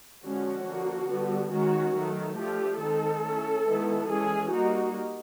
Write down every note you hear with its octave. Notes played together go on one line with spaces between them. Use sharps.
D3 F3 G#3 C#4 F#4
D3 F3 A#3
D3 G3 B3
D#3 G#3 C#4 F#4
D#3 F#3 A3
F3 A3 D4 F4 G4
D#3 G#3 C4 D#4 A4
A3 C#4 E4
D#3 G#3 B3 E4
E3 G#3 C#4 G#4
G3 A#3 D#4 F#4